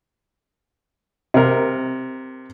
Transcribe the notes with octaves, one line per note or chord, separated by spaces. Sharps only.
C3 A#4